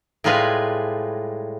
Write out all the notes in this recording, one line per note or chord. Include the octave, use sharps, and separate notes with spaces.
A2 G3 G#3 F4 B4 G#5